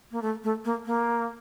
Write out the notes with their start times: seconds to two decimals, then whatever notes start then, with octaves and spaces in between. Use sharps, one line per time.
0.12 A#3
0.22 A3
0.44 A3
0.65 A#3
0.86 A#3